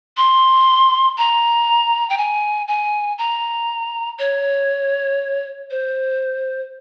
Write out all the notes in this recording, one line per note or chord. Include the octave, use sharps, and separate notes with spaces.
C6
A#5
G5
G#5
G#5
A#5
C#5
C5